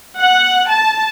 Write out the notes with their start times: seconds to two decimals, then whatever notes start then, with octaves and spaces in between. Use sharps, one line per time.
0.19 F#5
0.71 A5